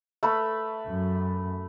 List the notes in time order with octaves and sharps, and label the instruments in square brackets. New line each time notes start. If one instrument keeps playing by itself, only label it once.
[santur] A3 B4 B5
[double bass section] F#2